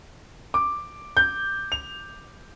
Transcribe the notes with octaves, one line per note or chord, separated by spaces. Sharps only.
D6
G6
F7